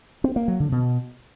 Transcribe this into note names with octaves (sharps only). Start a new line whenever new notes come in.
C4
A#3
F#3
D3
B2